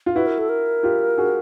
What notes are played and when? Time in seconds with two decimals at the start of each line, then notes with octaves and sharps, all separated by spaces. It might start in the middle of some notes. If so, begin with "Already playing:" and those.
0.06 F4
0.15 E4 F#4 B4
0.27 A#4
0.39 A4
0.49 A#4
0.83 F4 G4
1.18 F#4 G#4